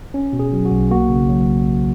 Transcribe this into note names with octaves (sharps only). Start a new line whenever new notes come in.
C#4
B2
G#4
F#3
F#4
B1
A#3 F#4
C#3
F#3